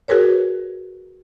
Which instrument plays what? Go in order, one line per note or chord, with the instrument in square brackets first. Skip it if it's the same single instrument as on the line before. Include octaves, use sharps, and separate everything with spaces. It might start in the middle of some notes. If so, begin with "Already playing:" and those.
[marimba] F#4 G#4 A#4 B4 C#5